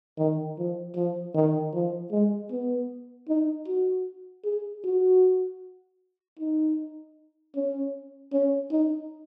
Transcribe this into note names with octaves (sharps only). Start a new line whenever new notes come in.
D#3
F3
F3
D#3
F3
G#3
B3
D#4
F#4
G#4
F#4
D#4
C#4
C#4
D#4